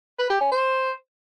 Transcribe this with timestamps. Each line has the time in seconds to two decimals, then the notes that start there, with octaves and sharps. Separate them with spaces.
0.19 B4
0.30 G4
0.41 C#4
0.51 C5